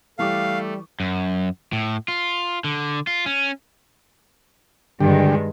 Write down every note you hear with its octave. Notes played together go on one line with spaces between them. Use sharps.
E3 G3 A3 F5 C#6 D6
F#2
A2
F4
D3
F4
C#4
G2 D3 D#3 G#3 G4